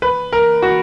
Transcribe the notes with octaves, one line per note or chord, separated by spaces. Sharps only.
B4
A#4
F#4